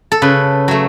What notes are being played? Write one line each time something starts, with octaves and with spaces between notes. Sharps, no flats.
A4
C#3 B4
F#3 A3